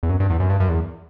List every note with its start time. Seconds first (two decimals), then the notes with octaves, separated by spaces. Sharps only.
0.03 E2
0.09 F#2
0.20 G2
0.30 E2
0.40 F#2
0.50 G2
0.60 F#2
0.69 E2